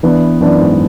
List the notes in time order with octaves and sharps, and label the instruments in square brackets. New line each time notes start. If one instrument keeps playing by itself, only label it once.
[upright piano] E3 B3 D4
[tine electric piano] F#2 [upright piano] E3 B3 D4
[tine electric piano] G#2